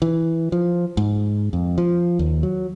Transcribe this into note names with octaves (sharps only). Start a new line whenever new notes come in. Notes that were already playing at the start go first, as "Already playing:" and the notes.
E3
F3
G#2
F2
F3
D#2
F#3